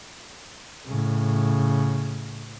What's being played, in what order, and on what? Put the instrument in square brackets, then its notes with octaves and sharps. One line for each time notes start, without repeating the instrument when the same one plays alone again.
[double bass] A2 C#3